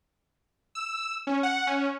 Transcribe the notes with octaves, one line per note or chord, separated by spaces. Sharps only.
E6
C#4
F#5
C#4